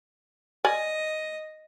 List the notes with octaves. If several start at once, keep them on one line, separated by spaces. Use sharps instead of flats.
D5 D#5 G#5